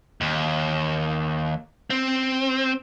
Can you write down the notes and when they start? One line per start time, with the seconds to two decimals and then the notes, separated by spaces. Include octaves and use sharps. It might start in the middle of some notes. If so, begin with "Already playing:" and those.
0.21 D#2
1.90 C4